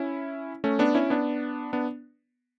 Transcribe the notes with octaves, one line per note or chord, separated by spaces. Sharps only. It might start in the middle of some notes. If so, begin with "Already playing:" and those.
Already playing: C#4 E4
A3 C#4
B3 D4
C#4 E4
B3 D4
B3 D4